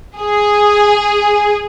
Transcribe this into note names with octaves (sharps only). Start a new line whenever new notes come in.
G#4